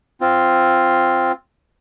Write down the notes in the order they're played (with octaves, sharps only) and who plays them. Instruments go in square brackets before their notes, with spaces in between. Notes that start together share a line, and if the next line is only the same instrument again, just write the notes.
[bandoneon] C4 F4